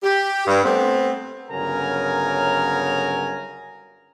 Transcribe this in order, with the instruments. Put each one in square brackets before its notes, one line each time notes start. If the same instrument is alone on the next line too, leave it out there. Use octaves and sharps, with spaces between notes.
[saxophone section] G4
G2
A3 B3 C4
[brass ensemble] G1 C#3 F#3 A#4 G#5 A#5